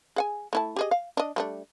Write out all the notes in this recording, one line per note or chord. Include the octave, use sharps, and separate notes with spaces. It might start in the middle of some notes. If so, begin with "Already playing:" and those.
G#4 F#5 G#5
A3 E4 A5
G4 G#4 D#5
F5
D4 D#5
G3 A3 D4